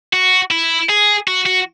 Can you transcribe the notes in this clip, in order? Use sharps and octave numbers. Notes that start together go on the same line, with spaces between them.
F#4
E4
G#4
F#4
F#4